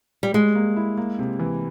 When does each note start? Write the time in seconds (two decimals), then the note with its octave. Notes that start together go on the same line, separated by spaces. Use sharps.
0.23 G3
0.34 G3 G#3
0.55 A#3
0.76 E4
0.98 A#3
1.19 C3
1.39 E3